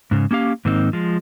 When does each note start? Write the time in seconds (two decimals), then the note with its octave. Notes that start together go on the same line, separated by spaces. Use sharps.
0.11 G#2 C#3
0.31 A#3 C#4 G4 F5
0.65 G#2 D#3 A#3 C4 D#4
0.93 F3 G#3